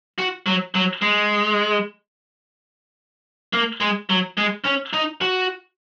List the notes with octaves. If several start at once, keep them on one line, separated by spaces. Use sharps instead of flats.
F#4
F#3
F#3
G#3
A#3
G#3
F#3
G#3
C#4
D#4
F#4